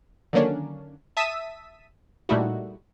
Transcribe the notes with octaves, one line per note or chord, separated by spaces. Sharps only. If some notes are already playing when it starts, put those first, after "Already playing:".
D3 D#3 F#3 A#3 C#4 D4
E5 A5 D#6 E6 B6 D#7
A#2 G3 A3 D#4 E4 F#4